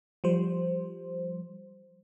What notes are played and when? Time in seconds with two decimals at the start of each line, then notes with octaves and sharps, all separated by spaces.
0.24 F3 G3 C5